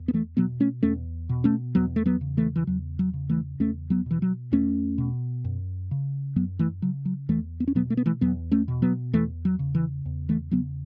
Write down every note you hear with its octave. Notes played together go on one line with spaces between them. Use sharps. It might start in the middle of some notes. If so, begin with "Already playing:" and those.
Already playing: E2
B3
E3 A3
B2 F#3 B3
A3 C#4
E2 A3 C#4
B2
A3 C#4
E2 F#3 B3
A3
F#3 B3
C#3
E3 A3
E3
E2 F#3
F#3
C#3
E3 A3
E2 A3 C#4
F#3 B3
B2 E3
F#3
E2 A3 C#4
B2
F#2
C#3
F#2 F#3 B3
E3 A3
C#3 F#3
F#3
E2 E3 A3
B3
C#4
B2 F#3 B3
A3
B3
E3 A3
E2 F#3 B3
A3 C#4
B2
F#3 B3
E2 E3 A3
F#3
C#3
E3
E2
E3 A3
C#3 F#3 B3